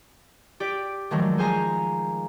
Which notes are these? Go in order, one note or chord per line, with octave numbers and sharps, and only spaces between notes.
G4 D5 B6 D7
D#3 F3 F#3 G#3 A3
G#4 C5 F5 G#5 A#5